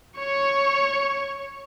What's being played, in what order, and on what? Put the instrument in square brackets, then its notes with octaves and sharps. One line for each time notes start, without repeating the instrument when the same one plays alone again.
[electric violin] C#5 C#6